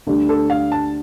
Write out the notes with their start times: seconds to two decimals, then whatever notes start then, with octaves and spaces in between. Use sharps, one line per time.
0.07 D2 D3 G3 D4
0.29 A4
0.50 F5
0.72 A5